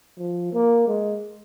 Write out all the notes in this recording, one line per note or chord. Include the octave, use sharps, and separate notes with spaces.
F3
A#3
G#3